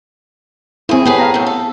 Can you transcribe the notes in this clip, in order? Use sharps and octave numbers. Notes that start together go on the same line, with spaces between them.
E2 C4 E4 G#4
A2 B3 G4 G#4 B4
F5 A#5
F#2 A2
A4